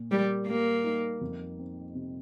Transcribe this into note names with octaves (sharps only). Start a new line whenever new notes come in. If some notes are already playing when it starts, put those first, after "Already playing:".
Already playing: A#2
G3 A#4
G3 A#3
D#4
F2
C4
C3